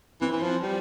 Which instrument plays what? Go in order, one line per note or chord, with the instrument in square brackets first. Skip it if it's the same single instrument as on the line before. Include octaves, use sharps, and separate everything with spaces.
[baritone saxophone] E3 [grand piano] C4
[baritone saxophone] E3
F3
G3